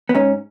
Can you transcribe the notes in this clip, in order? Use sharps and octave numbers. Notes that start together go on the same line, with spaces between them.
B3
G#2 C#4